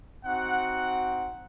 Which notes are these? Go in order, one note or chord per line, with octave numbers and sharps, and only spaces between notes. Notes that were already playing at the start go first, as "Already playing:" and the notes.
C4 D#4 F#4 F#5